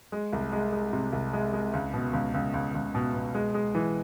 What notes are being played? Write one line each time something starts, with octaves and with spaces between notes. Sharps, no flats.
G#3
C2
G#3
G#3
C3
C2
G#3
G#3
C#2
B2
C#2
C#2
C#2
C#2
B2
B2
G#3
G#3
E3